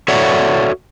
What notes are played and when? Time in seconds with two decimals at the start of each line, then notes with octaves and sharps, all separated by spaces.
0.08 F#4 A4 C#5 D5 E5 F#5